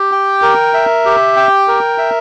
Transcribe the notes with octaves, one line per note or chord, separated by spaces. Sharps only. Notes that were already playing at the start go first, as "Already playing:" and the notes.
Already playing: G4
G5
A#4
E5
G4
G5
A#4
E5